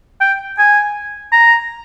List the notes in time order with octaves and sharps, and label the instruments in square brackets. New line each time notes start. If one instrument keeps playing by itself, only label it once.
[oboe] G5
G#5
A#5